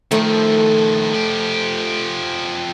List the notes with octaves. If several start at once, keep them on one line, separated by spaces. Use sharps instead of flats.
D#3 F3 A3
F3 G4